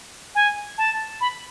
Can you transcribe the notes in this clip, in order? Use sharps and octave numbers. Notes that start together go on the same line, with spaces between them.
G#5
A5
B5